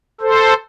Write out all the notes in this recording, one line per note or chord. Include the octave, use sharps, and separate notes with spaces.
A4 C5